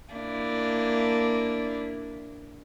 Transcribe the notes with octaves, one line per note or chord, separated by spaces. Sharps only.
A#3 D4 E4